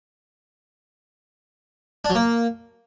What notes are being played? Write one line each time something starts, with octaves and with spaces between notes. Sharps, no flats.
D4
F#3
A#3